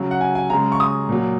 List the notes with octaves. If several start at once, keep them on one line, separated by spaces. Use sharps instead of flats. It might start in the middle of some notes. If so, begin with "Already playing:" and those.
Already playing: C#3 F#3
F#5
G#5
G#5
C#3 G#3 A#5
C#6
D#6
A#2 F#3